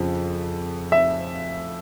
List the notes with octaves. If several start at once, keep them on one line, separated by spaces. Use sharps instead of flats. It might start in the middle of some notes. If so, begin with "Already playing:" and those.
Already playing: F2 C#3 F3
E5